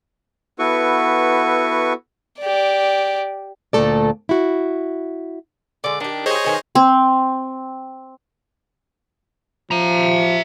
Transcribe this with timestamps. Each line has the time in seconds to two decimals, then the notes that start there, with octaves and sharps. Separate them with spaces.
0.59 B3 E4 F#4 A4 B4 C#6
2.40 G4 D5
3.73 D2 A#2 D#3 A3 A4 D5
4.29 E4 F#4
5.84 D3 G#3 D5
6.00 D#3 D4 G4
6.26 G#4 C5 C#5 D#5
6.46 D#3 B4 G#5
6.75 C4
9.71 F3 E5 A#5